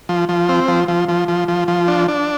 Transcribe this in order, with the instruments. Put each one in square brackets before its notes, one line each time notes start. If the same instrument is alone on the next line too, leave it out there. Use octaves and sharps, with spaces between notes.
[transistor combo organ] F3
F3
C4
F3
F3
F3
F3
F3
F3
D4
D4